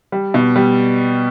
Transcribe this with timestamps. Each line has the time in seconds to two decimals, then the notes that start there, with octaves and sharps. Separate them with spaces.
0.12 G3
0.34 B2
0.56 G3